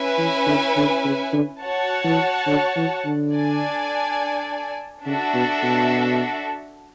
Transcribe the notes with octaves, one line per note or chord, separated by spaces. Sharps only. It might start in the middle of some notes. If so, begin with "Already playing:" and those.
Already playing: C#4 E4 B4 E5 G#5
E3
D3
D3
C#3
D3
F#4 C#5 F#5 A5
E3
D3
E3
D3
D4 A4 D5 G#5
C#3 D4 F#4 A4 E5
B2
B2